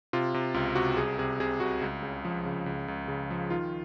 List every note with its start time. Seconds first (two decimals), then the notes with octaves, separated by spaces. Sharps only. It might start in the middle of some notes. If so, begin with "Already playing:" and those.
0.13 C3 F4
0.34 C3
0.54 C#2 F4
0.75 C3 F#4
0.97 C2 G#4
1.19 C3 G#4
1.40 C3 G#4
1.60 C2 F#4
1.81 C#2
2.03 C#3
2.25 F3
2.45 C#3
2.66 C#2
2.88 C#2
3.08 C#3
3.30 F3
3.50 D#3 F4